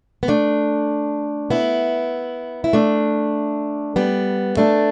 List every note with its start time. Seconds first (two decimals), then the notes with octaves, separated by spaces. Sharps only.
0.23 B3
0.28 A3 D4
1.50 B3 E4
2.64 E4
2.73 A3 D4
3.96 G3 B3
4.57 A3 D4